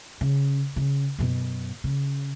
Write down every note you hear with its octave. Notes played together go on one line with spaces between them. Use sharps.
C#3
C#3
F#2 B2
C#3